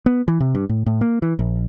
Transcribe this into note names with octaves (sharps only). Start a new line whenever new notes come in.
B3
E3
C3
G2
A2
A2
A#3
E3
A#1